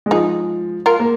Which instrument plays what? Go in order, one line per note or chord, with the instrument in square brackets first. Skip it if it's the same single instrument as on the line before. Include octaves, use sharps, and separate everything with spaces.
[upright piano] G#3
[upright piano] F3 [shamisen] D#4 G#4
[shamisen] F4 A#4
[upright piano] A#3